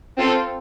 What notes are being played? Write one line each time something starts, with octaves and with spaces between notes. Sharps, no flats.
C4 F4 A4